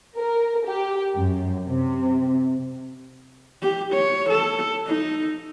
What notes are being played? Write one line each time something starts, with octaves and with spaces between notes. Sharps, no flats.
A#4
G4
F#2
C3
G4
C#5
A4
D#4